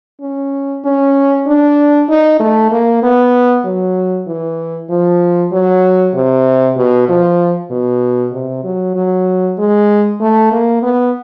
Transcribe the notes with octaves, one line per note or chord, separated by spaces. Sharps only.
C#4
C#4
D4
D#4
A3
A#3
B3
F#3
E3
F3
F#3
C3
B2
F3
B2
C3
F#3
F#3
G#3
A3
A#3
B3